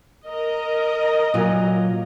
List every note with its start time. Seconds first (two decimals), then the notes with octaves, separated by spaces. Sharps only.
0.25 A#4 D#5
1.34 A#2 F#3 F4